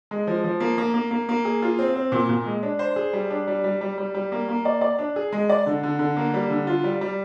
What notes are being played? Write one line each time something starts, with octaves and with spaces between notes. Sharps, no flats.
G#3
F3
F3
A#3
A#3
A#3
A#3
A#3
G#4
F4
C4
C4
A#2
A#2
G#3
D4
C5
G#4
G3
D4
G3
G3
G3
G3
G3
A#3
A#3
D5
D5
D4
G#4
G#3
D5
D3
D3
D3
A#3
G3
D3
F4
G3
G3